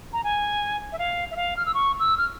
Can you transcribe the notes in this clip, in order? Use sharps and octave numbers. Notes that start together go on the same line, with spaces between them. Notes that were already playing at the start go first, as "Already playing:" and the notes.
A#5
G#5
E5
F5
E5
F5
F6
E6
C#6
E6
F6